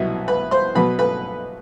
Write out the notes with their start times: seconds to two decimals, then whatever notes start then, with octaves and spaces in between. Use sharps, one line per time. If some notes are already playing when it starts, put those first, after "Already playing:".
Already playing: C2 B2 F#3 B3 E4
0.28 B4 B5
0.51 C5 C6
0.75 B2 F#3 B3 B4 B5
0.99 B4 B5